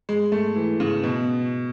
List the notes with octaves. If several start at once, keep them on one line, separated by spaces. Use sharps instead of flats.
G#3
A3
E3
C#3
B2